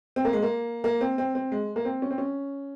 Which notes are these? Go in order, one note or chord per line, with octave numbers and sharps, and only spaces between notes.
C4
A#3
G#3
A#3
A#3
C4
C4
C4
G#3
A#3
C4
C#4
C4
C#4